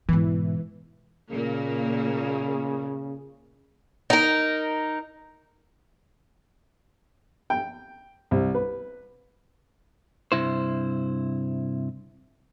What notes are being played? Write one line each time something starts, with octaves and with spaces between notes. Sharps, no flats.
G#2 B2 E3
A#2 C#3 A#3
D#4 A#4
G5
C2
B4
G2 C3 E4 C5